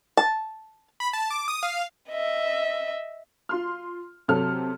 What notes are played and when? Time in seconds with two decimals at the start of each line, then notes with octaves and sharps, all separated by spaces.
0.17 A5
1.00 B5
1.13 A5
1.30 D6
1.48 D#6
1.63 F5
2.10 D#5 E5
3.49 F4 C6 F6
4.28 C3 F#3 C4 A4 F6